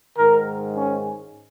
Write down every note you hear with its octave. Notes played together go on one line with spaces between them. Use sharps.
G#2 D#3 A#4
C#4